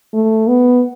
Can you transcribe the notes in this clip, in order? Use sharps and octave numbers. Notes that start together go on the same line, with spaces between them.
A3
B3